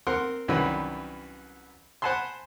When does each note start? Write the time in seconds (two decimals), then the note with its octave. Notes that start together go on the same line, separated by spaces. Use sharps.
0.07 C4 A#4 F#5 C6
0.48 C2 F#2 D#3 E3 B4 B5
2.02 C5 F#5 G#5 A5 B5 C6